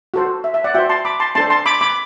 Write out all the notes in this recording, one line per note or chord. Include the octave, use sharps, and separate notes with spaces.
F#4 A4 C5
E5
E5
D5 F#5
F#4 C5 E5 G5
A5 C6
B5 D6
A5 C6
D4 A4 C5 A5 C6
A5 C6
B5 D6
B5 D6